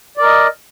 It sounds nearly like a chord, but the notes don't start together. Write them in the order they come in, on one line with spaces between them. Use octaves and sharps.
D5 A#4 D#5